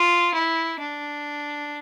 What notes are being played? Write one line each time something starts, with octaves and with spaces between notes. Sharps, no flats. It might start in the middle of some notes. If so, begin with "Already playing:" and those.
Already playing: F4
E4
D4